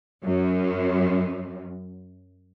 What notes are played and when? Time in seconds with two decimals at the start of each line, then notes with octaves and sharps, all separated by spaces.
0.23 F#2